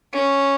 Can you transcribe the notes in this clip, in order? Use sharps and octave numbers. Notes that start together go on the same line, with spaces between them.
C#4